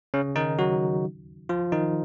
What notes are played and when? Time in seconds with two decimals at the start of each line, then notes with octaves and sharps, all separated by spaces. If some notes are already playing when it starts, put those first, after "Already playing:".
0.14 C#3 C#4
0.36 D#3 D#4
0.59 F#3 F#4
1.49 F3 F4
1.72 D#3 D#4